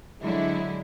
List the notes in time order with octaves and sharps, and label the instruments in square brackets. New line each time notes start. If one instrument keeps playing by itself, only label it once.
[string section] D3 F#3 G#3 E4